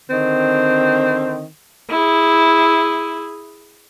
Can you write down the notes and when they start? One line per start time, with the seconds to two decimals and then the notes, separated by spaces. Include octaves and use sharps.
0.10 D3 D#3 C4
1.90 E4 G#4